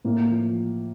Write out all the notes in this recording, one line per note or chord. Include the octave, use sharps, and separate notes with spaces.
A2 A#3
F3